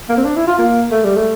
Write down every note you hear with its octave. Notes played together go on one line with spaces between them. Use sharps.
A#3
C4
D4
E4
F4
A#3
A3
G3
A3